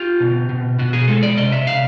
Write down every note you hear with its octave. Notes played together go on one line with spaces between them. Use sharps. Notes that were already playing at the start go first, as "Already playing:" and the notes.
Already playing: F4 G4
B2
B2
B2 F#4
G#4
G#3 A4
D5
C3 D#5
E5
C3 F5